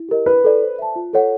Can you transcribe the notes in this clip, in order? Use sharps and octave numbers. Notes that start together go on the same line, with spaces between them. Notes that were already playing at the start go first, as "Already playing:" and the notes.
Already playing: E4
G4 A#4 D#5
E4 B4
A4 D5
C5
E5 A5
F4
A4 C#5 F#5